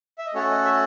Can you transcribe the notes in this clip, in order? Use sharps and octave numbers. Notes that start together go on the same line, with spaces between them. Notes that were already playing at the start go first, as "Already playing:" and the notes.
E5
D#5
A3 C#4 F#4 A4 C#5
D#5
E5